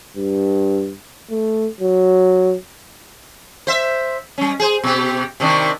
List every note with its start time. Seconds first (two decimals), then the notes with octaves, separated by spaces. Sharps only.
0.17 G2
1.31 A3
1.81 F#3
3.67 C5 E5
4.38 G3 C#4
4.59 G#4 C5
4.83 B2 G4
5.40 C3 D#3 D4